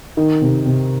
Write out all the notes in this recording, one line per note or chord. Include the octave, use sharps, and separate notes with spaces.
D#3
C3
C3